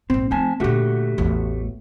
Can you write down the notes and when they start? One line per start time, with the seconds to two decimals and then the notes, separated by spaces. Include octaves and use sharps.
0.10 A#1 G#2 C4
0.31 F3 A3 C4 G#5 A5
0.60 A#2 D3 A3 F#4 G4
1.18 A1 E2